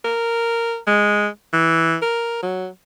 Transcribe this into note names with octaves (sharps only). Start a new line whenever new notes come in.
A#4
G#3
E3
A#4
F#3